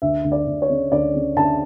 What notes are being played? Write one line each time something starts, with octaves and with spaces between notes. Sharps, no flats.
D2 E5
D2
D5
D2
C#5
C#3
D2 D5
C#3
D2 A5